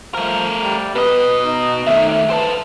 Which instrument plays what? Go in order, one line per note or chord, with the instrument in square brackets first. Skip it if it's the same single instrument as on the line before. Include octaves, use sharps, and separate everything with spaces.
[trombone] F3 [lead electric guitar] A3 A#4
[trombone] G3
[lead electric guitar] B2 D#5 [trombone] B4
[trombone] D#4
[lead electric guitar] D#3 A3 [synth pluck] E5
[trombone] B4 [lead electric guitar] C5 A5